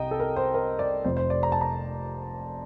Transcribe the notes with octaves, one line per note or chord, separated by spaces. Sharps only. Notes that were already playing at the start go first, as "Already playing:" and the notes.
Already playing: C2 C3 D#5 G5 A#5
A4
A#4
C5
A#4
D5
F1 F2 C3 C5
C5
D5
A#5
A5
A#5